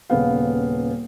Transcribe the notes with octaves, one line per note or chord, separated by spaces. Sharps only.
D#1 C#3 B3 F5